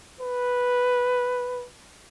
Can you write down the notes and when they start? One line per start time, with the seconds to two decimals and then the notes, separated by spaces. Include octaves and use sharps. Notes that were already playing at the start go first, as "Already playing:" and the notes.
0.21 B4